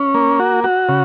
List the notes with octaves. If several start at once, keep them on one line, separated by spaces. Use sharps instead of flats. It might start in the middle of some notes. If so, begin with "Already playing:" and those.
Already playing: C#4
A#3
F#4
F#4
C#3